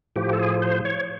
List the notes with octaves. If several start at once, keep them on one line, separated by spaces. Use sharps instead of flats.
A2 F3 G4
A4
G#4
C5
C#5